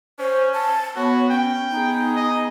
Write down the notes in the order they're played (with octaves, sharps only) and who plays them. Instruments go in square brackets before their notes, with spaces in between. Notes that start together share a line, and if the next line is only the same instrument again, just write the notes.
[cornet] C#4 [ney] C5
[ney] A5
[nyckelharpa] B3 [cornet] F#4 [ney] C#5
[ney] C#4 [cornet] G5
[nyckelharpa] B3 G#4 [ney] D#4
[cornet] D#5